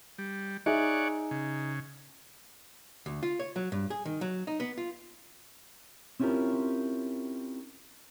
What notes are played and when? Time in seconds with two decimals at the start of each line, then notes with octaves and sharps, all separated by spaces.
0.18 G3
0.66 D#4 G#4 C#5 D5 E5 F#5
1.31 C#3
3.06 D2
3.23 F4
3.40 C#5
3.56 F#3
3.72 G2
3.90 G#4
4.05 D#3
4.21 F#3
4.47 D#4
4.60 B3
4.78 F4
6.20 C4 C#4 E4 F4 G4 A#4